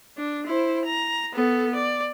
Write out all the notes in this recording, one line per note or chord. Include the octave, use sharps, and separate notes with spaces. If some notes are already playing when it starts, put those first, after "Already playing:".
D4
E4 C5
A#5
B3 A4
D5